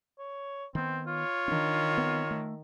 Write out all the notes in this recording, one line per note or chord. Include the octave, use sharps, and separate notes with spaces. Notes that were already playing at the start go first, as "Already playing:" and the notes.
C#5
D#3 B3 C4
F4 C#5
D#3 C#4 D4
B3 C4
A3